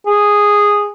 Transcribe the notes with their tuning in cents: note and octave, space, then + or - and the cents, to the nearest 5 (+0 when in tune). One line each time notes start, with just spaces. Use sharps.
G#4 -10